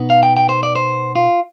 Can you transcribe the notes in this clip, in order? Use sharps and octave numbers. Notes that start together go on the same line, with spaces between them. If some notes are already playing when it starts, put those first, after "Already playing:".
Already playing: B2 B3 D#4
F5
G5
G5
C5
D5
C5
F4